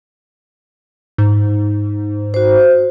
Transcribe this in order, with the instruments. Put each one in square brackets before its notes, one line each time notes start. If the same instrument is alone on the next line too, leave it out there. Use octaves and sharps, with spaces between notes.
[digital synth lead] G#2
[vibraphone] F#4 C5